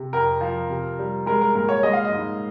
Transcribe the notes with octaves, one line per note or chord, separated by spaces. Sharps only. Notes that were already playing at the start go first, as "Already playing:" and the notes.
Already playing: C3
F2 A#4
F3
C3
G3
G#3 A#4
A#4
A#2 A#4
C#5
G#3 D#5
F5
D#5
G#2